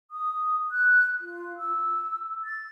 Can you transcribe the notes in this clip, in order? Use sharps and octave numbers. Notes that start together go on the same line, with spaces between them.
D#6
F#6
F4
E6
A6